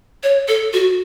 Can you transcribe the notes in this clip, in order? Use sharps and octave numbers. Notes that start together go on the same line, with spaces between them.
C#5
A4
F#4